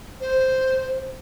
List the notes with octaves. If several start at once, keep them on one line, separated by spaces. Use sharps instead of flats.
C5